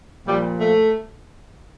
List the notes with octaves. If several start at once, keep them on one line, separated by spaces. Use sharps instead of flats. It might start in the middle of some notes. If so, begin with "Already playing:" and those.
A#2 F3 G3
A3